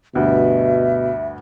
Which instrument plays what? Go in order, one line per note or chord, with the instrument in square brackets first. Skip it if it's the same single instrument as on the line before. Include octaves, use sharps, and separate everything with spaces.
[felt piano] D2 G2 [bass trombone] B2 [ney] E5